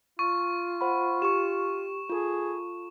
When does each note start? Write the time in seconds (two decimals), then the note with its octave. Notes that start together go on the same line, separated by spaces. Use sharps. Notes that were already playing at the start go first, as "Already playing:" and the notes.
0.19 F4 C#6
0.81 C5 F#5 B5
1.22 G4 C#6 E7
2.09 F4 G#4 A4